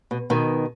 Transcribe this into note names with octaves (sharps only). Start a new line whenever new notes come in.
B2
B2 D#3